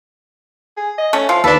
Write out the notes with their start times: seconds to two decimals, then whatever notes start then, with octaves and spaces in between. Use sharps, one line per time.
0.77 G#4
0.98 D#5
1.13 A3 C#4
1.29 F3 F5
1.44 D#2 D4 A4 B4